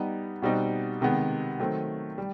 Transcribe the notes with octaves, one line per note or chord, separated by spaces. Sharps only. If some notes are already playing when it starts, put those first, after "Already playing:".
Already playing: G3 B3 D#4
B2 G3 C4 D#4 F#4
C3 D#3 G#3 B3
D#3 F#3 A3 C4
G3